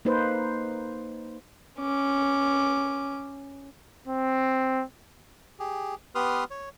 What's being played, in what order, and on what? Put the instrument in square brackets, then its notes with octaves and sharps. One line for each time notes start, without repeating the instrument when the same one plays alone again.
[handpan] A#3 D#4 B4 C5
[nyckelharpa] C#4 D6
[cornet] C4
[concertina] G4 G#4
B3 G4 B4 C6 D#6 F6
C#5